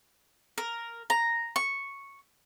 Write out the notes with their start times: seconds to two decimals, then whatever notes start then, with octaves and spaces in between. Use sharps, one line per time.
0.58 A#4
1.10 A#5
1.56 C#6